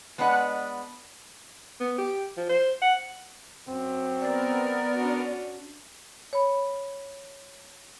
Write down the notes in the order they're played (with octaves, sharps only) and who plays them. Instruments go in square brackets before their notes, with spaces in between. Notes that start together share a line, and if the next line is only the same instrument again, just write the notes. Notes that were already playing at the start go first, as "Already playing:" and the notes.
[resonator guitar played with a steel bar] G#3 B3 D4 B4 D#5 F#5
[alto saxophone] B3
G4
F3
C5
F#5
[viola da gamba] F#2 [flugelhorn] C4
[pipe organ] B3 A#4 [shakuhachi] D5
[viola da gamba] C#4 D4 F#4
[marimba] C#5 B5